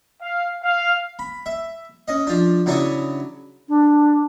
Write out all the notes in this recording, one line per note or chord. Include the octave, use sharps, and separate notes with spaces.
F5
F5
B5
E5
C#4 D#5
F3 D4
C#3 F#3 D4 E4 C#6 D#6
D4